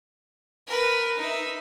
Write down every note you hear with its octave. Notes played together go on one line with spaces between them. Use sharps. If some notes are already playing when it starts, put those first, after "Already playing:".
A#4 B4
D#4 E5